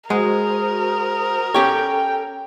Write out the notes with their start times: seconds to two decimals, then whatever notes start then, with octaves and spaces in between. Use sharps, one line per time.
0.10 G#3 F#4 A#4 C5 D#6
1.54 C#4 G4 A4 C#5 G5